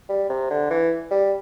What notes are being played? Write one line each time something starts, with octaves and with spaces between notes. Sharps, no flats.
G3
C3
D3
E3
G3